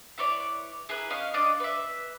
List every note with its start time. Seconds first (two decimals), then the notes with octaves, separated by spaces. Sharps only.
0.18 E4 B4 C#5 D5
0.89 E4 G#4 A#4 B4
1.10 C#4 D#5 F5
1.34 D4 D5 D#5
1.60 B4 E5